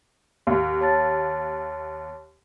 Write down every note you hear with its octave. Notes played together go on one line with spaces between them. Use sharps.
D#2
C#5 A5 A6